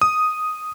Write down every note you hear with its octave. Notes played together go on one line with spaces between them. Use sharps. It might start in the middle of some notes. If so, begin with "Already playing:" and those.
D#6